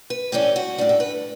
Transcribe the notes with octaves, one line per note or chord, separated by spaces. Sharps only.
B4
A2 E3 G3 C#4 G4
F#4
A2 G3 D4
A4
B4